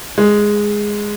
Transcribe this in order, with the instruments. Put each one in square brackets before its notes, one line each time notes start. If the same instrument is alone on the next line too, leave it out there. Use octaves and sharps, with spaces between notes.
[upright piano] G#3